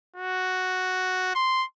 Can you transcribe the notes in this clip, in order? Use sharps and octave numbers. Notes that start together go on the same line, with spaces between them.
F#4
C6